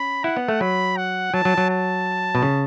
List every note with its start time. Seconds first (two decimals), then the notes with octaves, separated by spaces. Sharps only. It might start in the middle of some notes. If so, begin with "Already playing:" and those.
Already playing: C#4 B5
0.24 E4 F#5
0.37 B3
0.48 A3
0.61 F#3 B5
0.97 F#5
1.34 F#3 A5
1.45 F#3
1.58 F#3
1.70 A5
2.35 B2
2.43 C#3